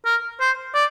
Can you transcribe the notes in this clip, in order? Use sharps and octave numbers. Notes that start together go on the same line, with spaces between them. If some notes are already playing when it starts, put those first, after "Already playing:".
A#4
C5
D5